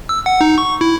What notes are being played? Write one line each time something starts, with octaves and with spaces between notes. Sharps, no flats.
E6
F#5
D#4
C#6
E4